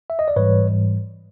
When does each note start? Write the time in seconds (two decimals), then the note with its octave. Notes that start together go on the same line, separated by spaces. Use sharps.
0.10 E5
0.19 D#5
0.28 D5
0.36 G#2 E3 G3 B4 C#5